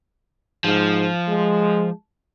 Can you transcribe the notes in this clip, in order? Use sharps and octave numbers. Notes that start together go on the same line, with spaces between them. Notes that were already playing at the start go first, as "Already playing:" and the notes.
G#2 F3
G#3